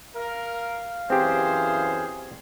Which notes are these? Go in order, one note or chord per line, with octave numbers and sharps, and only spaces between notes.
A#4 F5
F#2 E3 C4 G4 G#4 C5